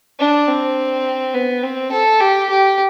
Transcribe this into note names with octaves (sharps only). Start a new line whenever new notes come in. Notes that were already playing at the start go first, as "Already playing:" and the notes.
D4
C4
B3
C4
A4
G4
G4